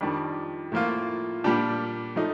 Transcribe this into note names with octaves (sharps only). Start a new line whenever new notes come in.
F2 D#3 G3 D4
A2 F3 A#3 F4
A#2 G3 D4 G4
F3 A3 D#4